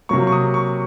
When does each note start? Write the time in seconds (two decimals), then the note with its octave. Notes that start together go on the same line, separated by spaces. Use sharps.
0.09 C3 F#3 A#3 C#6
0.27 C#6
0.32 D#6
0.54 C#6